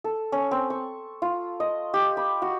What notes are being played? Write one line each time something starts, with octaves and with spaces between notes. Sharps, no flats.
A4
C#4
C4
C#6
F4
D#5
G4
B5
F#4